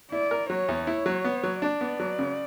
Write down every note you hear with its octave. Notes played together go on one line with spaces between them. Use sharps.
E4 D5
A#4
F#3 C#5
E2
E4 C#5
F#3
B3
F#3
D4 D5
B3
F#3
C#3